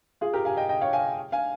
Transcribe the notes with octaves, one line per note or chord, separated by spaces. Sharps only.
F4 G#4
G4 A#4
F5 G#5
D#5 G5
D#5 G5
C#5 F5
F5 G#5
F5 G#5